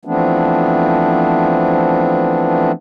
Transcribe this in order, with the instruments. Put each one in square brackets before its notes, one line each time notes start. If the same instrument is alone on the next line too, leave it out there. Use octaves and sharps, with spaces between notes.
[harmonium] E3 F3 A3 B3 C4 D4